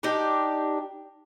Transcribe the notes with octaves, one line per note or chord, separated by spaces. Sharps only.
D4 D#4 G4